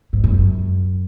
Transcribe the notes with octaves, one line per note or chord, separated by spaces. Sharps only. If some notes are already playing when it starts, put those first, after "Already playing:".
G#2
F#2